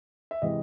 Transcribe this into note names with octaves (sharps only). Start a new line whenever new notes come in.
E5
C3 E3 G#3 D#5